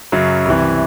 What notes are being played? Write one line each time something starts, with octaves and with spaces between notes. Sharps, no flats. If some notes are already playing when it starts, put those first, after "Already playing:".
F#2 C#3 F#3
C2 C3 E3